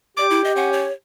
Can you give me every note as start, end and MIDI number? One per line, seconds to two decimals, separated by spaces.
0.17 0.92 67
0.17 0.26 74
0.17 0.41 86
0.30 0.44 64
0.44 0.55 75
0.56 0.85 61
0.56 0.72 78
0.73 0.92 73